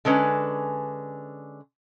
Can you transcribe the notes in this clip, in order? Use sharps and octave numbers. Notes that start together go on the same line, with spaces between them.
D3 G#3 C#4 B4